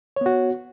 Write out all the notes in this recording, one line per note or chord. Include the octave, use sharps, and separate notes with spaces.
B3 F#4 C#5